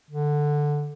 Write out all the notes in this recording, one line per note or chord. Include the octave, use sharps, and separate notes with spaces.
D3